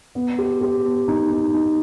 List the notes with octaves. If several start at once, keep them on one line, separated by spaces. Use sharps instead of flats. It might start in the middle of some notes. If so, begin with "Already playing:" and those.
B3
G4
G4
B3
D#4
D#4
D#4